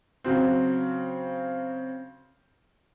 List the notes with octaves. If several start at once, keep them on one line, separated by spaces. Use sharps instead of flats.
C#3 F#3 C4